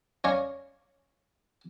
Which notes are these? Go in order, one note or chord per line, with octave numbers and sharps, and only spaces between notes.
C#4 D5 F5 G#5 A#5 C#6